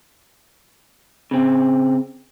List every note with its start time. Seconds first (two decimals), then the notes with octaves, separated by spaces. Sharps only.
1.31 C#3 C4